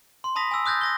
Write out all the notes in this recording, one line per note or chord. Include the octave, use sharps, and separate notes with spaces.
C6
A5 B5 D#6 A#6 B6
G#5 E6
D#6 F#6 G6 A6 A#6
D#6 A#6 G7